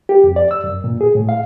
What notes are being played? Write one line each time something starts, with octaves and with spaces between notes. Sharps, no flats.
G4
F2
D5
E6
F#2
A#2
G#4
A2
F5